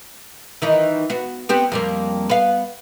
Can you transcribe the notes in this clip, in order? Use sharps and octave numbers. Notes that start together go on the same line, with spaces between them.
D#3 E3 D#4
B3 F#4
B3 C4 G4
F2 G3 A#3
B3 F5